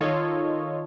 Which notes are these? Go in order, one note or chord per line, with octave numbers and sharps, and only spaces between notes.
D#3 F4 A4 C#5 D#5